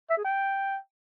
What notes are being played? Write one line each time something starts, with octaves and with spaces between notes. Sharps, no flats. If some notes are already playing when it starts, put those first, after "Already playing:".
E5
G#4
G5